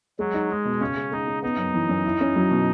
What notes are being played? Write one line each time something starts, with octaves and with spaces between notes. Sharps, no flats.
F#3 G#3
D#4
G#3 D#4
B2
C#3 C#4
G#3
G#3 D#4
C#4
B3 D#4
F#2
E3
F#2
E4
C#4
F#3
B2